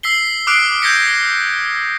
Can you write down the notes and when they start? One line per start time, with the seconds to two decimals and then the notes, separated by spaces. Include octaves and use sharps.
0.03 E6 B6 C7 G7
0.47 D6 D#6 F6 F#6 C7 D7
0.82 G6 G#6 A#6 B6 C#7